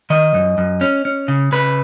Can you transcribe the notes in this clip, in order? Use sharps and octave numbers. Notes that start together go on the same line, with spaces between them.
D#3 D#5
F#2
F#2
C#4
C#4
C#3
C#3 B4